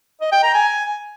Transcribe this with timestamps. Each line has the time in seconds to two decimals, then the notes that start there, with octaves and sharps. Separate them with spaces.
0.21 D#5
0.32 G5
0.43 A#5
0.54 G#5